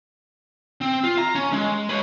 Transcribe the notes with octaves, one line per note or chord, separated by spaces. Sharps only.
C4
F4
A#5
C#4
G#3
B4 C#5